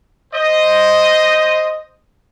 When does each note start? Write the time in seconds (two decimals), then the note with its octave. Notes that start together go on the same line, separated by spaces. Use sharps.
0.34 C5 D#5